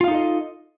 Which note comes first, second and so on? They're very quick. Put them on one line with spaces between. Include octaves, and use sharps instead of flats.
F4 F5 D#4 A4 D#5